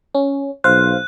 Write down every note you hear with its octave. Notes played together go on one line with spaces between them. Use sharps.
C#4
B1 C5 F5 F#6